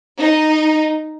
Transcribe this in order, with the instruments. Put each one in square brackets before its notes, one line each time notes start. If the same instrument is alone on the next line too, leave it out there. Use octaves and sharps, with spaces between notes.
[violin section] D#4